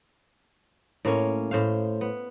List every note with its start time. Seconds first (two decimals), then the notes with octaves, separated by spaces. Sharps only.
1.05 A2 A#3 C#4
1.51 A2 C5 F5
2.01 B3